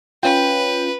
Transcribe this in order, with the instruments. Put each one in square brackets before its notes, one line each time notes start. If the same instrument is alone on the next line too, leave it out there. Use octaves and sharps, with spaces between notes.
[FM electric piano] C#4 F4 [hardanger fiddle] B4 [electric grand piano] G5